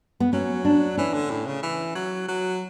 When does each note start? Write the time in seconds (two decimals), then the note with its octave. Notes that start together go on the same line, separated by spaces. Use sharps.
0.20 B3
0.33 F#3 C#4
0.65 D4
0.97 E3 C#4
1.14 D3
1.30 A2
1.46 C#3
1.63 E3
1.95 F#3
2.28 F#3